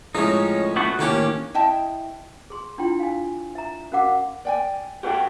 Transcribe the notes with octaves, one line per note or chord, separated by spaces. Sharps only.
A2 F3 G#3 C#4 D#4
A3 B3 F#4
A1 D#3 A#3 C#4 D4 G4
E4 D#5 G5 A5
G#4 C6
D4 E4 F4 G5 C6
F5 G#5
E5 A#5
C#4 F#4 A#4 F5 F#5 D6
D5 G5 G#5
F#4 G4 A4 B4 G5